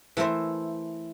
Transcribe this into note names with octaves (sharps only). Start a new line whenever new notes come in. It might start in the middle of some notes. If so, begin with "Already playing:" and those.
E3 A3 A#4 C5 E5